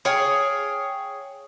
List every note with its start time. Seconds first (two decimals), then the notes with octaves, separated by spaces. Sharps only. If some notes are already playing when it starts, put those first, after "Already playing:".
0.05 G#4 C#5 F5 G5